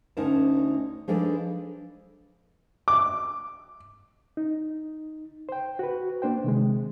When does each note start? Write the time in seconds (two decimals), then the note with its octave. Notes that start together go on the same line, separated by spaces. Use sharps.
0.17 D2 C#4 D#4 A#4 C5 A5
1.08 F3 G#3 D4 D#4 A4 B4
2.88 D6
4.37 D#4
5.49 C5 G5
5.79 F#4 B4
6.22 A#3 D4 C5 G5
6.44 C3 D#3 G#3